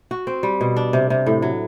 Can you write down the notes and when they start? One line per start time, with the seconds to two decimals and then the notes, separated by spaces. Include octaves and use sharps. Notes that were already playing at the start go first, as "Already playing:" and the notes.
0.11 F#4
0.27 C4
0.43 G3
0.61 B2
0.76 D4
0.93 C3
1.10 C3
1.26 A2
1.42 F#3